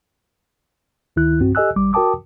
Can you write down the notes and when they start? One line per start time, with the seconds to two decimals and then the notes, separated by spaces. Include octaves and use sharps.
1.16 D2 D#3 E4 F#6
1.39 B1 G2 C4 F#4
1.55 G4 A4 D#5 G#5 E6 F#6
1.76 G#1 G3 D6
1.93 F#4 A#4 G5 A5 D6 D#6